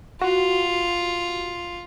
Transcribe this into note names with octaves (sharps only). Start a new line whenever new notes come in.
F4 F#4